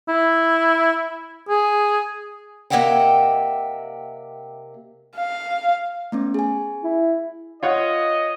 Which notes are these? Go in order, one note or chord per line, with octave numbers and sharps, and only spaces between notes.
E4
G#4
C3 A#3 D#5 E5 F#5 G5
F5
A3 B3 C#4
G#4 G#5
E4
F4 C#5 D#5 F#5